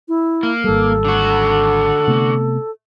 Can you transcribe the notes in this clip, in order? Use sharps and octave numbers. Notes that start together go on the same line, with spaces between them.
E4
A#3
G#1 G3 A4
D3 F#4
C3 A3 B3